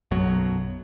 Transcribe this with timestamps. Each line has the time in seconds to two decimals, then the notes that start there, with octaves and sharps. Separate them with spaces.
0.11 B1 F#2 B2 F#3